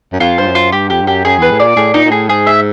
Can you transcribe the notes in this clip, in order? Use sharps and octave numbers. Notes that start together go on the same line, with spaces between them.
F#2
F2 F4
G2 C5
F#2
F4
G2 G4
F2 G4
G2
F#2 G4
F#2 G#4
E2 B4
A2
A#2 D5
A2 G#4
A#2 D#4
A#2
A2 G#4
G#2 G#4
E5